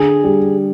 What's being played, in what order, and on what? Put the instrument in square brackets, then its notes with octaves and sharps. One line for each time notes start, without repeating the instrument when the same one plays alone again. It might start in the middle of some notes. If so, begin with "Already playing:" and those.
Already playing: [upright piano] D3 [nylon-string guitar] G#4
[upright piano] G3